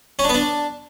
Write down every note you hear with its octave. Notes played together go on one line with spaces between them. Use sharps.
C#4
D4
B3
D4